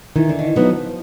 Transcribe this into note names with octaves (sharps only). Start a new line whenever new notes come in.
D#3 E3
D3
D#3
E3
F3 F#3 B3 D#4